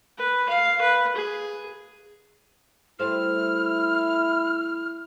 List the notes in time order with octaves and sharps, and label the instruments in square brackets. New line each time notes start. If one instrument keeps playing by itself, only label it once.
[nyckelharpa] B4
F5
B4
G#4
[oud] G3 A3 C5 [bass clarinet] E4 [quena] F6